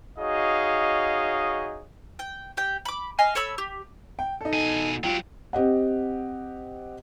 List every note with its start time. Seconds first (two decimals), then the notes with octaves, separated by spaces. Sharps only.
0.18 D#4 F#4 G#4 C#5 D#5 F5
2.19 G5
2.57 G4 G5
2.85 B5 D6
3.19 D#5 F5 G#5
3.35 A4 C#5 B5 E6
3.58 G4
4.19 G5
4.41 D#4 A4
4.53 B2 G#5
5.04 F#3 F4 G4 G5
5.53 C4 G4 D#5 F#5